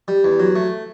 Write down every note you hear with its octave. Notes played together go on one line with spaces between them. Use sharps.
G3
E2
F#3
A3